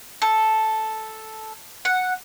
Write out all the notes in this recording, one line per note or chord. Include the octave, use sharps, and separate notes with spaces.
A4
F#5